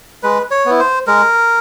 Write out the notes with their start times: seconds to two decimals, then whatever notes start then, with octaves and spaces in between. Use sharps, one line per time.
0.23 G#3 B4
0.51 C#5
0.65 B3 E4
0.79 C5
1.07 G#3 A#4